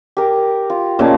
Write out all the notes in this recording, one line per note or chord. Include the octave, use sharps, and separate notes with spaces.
G4 A#4
F4
A#2 C#3 C#5 D#5 A5